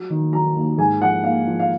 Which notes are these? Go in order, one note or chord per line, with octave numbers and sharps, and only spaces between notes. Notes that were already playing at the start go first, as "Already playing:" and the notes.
Already playing: F#3
D#3
F#3 A#5
D#2
G#2 G#5
F3 F#5
A#3 F5
F3
F5